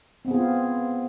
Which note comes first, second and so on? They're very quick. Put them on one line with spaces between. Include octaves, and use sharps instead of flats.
C4 B3 G#4 F4